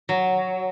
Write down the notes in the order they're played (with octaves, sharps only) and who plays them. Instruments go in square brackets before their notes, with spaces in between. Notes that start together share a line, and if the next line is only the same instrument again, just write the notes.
[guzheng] F#3